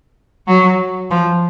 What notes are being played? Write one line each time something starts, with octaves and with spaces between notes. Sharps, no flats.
F#3
F3